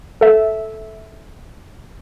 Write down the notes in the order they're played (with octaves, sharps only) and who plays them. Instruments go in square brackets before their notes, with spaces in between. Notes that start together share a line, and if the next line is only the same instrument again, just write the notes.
[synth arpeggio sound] A4 E5